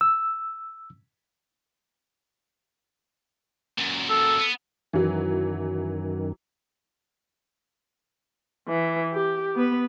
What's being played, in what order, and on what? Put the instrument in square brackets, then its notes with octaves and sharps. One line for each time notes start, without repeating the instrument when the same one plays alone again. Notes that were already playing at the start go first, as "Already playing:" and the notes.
[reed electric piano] E6
[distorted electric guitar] F#2 A#2
[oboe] A4
[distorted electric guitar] B3
[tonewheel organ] F#2 D#3 [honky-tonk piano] E3 F#3
[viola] E3
G4
B3 B4